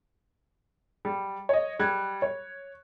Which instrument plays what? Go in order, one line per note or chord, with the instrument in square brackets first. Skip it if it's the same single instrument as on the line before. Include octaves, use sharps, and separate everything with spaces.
[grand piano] G3
C#5 D#5
G3 F#6 G#6
C#5